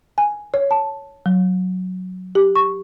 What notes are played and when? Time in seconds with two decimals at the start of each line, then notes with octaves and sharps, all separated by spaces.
0.18 G#5
0.54 C#5
0.71 A5
1.26 F#3
2.35 G4
2.56 C#6